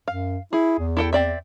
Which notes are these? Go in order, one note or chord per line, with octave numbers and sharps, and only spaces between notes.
F#2 F5
E4 G#4
E2
E4 A4 G5
C4 D5 E5